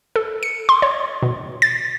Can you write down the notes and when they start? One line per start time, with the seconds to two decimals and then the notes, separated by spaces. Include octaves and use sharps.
0.16 A4
0.43 C#7
0.69 C6
0.82 C#5
1.23 B2
1.62 A6